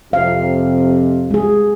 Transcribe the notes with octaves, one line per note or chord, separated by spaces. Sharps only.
F2 C3 F5
G#3 G#4